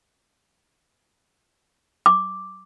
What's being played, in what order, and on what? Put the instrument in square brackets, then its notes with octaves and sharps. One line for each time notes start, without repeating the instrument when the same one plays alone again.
[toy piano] D6